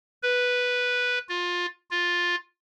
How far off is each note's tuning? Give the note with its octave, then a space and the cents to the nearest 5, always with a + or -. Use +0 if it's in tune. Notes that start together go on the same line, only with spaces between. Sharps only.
B4 -5
F4 +20
F4 +10